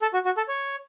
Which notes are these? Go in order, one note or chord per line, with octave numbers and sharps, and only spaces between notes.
A4
F#4
F#4
A4
C#5